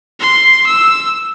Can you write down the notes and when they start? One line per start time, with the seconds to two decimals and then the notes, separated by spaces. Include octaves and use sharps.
0.20 C6
0.67 E6